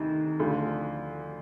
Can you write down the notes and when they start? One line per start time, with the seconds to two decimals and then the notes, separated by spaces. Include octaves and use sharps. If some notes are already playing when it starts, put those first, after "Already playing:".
Already playing: D2 C3 D#3
0.39 D2 D3 F3